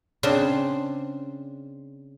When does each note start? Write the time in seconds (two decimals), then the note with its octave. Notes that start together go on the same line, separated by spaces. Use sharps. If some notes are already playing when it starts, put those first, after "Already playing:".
0.23 C#3 C4 D4 C5 C6